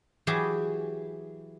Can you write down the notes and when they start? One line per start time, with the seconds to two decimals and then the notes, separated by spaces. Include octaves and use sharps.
0.27 E3 F#3 G4 G#4 E5